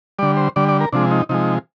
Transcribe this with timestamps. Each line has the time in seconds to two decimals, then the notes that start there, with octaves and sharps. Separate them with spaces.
0.19 D3 G3 D5
0.37 C5
0.56 D3 G3 D5
0.69 D5
0.80 A#4
0.93 C3 F3 G#3 D4
1.11 D#4
1.29 C3 F3 G#3 D#4